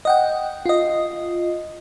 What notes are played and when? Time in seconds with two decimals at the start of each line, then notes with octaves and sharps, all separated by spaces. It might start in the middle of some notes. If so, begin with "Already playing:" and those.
0.05 D#5 F#5 G5
0.66 F4 D#5